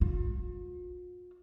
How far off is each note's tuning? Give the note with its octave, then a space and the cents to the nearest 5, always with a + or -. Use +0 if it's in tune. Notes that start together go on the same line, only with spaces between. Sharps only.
F4 +45